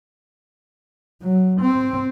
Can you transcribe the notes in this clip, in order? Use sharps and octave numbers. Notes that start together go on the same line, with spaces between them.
F#3
C4